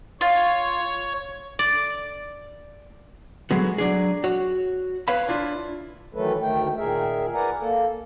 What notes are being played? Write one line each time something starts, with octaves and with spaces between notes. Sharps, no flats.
F4 C#5
D5
F#3 G#3 A3 B3 F#4
F#3 D4 G#4
F#4 C#5
B4 C#5 F5 B5
D4 E4 F4
D#3 E3 F#3 A3 A4 B4
D2 D#3 A3 G5
A#2 D#3 G#4 A#4 E5
A#4 B4 D5 F#5 G#5 A#5
A#3 A4